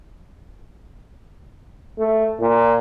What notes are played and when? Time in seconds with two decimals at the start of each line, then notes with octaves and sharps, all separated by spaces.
1.98 A3
2.40 A#2